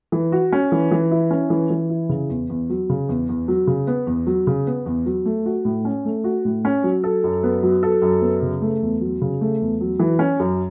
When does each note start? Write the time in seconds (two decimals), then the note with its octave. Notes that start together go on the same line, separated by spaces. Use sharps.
0.12 E3
0.32 F#4
0.53 C#4
0.72 E3
0.91 E3
1.11 E4
1.31 C#4
1.50 E3
1.70 E3
1.90 E4
2.09 C#3
2.29 E2
2.49 E2
2.70 F#3
2.90 C#3
3.09 E2
3.29 E2
3.48 F#3
3.67 C#3
3.87 B3
4.07 E2
4.27 F#3
4.47 C#3
4.67 B3
4.86 E2
5.06 F#3
5.25 A3
5.46 F#4
5.65 A2
5.85 C#4
6.05 A3
6.24 F#4
6.45 A2
6.65 C#4
6.84 F#3
7.04 A4
7.24 F#2
7.43 B3
7.63 F#3
7.83 A4
8.02 F#2
8.22 B3
8.42 C#3
8.62 A3
8.82 E2
9.01 F#3
9.21 C#3
9.41 A3
9.61 E2
9.81 F#3
9.99 E3
10.19 C#4
10.40 F#2